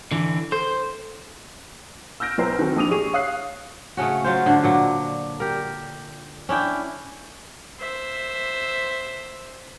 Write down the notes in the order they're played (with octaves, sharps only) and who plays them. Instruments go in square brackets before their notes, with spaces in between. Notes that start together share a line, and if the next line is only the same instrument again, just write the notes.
[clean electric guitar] D3 E3
[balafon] A4 [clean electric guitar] C5
[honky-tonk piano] E6 F6 G6 A#6 D7
B1 B3 C5 A#5
D#3 C4 F#4 A4
A#1 D4 D#6 D#7 F7
G#4 C#6 D#7
C#5 F5 D#6 F#6 C7
[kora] C#3 A3 C#4 F#4
F#3 F4 C5
D3 D4
A#2 F#3
G4 A#4
C#4 D4 E4 G5
[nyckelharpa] C5 E5